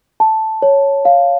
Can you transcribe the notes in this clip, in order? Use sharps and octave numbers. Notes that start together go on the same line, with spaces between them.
A5
C#5
F5